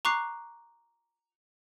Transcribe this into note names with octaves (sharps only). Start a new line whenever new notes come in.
A#5 C#6 D6 F#6 C7